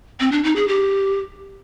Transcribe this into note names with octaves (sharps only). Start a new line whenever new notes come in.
C4
D4
D#4
G#4
G4